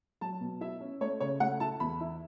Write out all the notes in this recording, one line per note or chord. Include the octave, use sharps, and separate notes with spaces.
F#3 A5
B2
E4 E5
C#4
A3 C#5
C#3 C#5
A3 F#5
E4 A5
E2 B5
E4